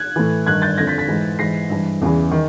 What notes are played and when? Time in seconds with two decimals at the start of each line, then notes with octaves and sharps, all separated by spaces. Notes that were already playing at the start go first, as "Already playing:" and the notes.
Already playing: F#6 G#6
0.16 A2 E3
0.46 G2 D#3 F#6 G#6
0.62 G6 A6
0.78 F2 D3 G#6 A#6
0.87 A6 B6
0.98 A6 B6
1.08 G#2 E3
1.39 G#2 E3 A#6 C7
1.70 G2 E3
2.01 E2 C#3 E3
2.31 D#3